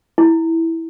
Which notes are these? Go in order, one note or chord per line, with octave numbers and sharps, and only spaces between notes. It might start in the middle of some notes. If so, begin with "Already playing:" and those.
E4